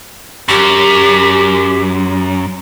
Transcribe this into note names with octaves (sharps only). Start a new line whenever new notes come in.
F#2 G4